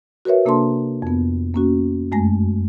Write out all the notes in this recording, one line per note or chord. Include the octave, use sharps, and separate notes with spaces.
F#4 A#4 B4 C#5 E5
C3 A#3 D4 A4 A5 C6
F2 B3
A#3 C#4 F#4
F#2 G#3 A3 G#5 A#6